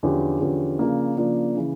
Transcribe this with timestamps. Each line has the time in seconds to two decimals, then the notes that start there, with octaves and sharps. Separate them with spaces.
0.03 E2 D3 F3 C#4 G4
0.41 E2 D3 F3 C#4 G4
0.79 C#3 F3 A#3 D4
1.16 C#3 F3 A#3 D4
1.57 C#3 E3